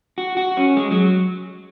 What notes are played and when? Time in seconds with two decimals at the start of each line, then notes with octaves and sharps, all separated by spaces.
0.18 F#4
0.37 F#4
0.57 C#4
0.77 G#3
0.91 F#3